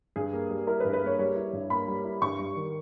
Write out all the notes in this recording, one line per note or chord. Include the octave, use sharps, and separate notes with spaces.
G2 G#4
A#3
G3
E4 A#4
B4
G2
B4
A#3 C#5
G3 C#5
E4
G2
A#3 B5
G3
E4
G2 C#6
G3
D#3